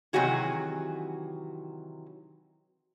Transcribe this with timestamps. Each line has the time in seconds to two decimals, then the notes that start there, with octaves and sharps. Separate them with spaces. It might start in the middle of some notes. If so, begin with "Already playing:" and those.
0.13 C3 D#3 E3 F#3 F#4 G#4